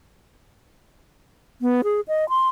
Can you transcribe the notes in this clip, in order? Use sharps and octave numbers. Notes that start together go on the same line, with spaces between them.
B3
G#4
D#5
C6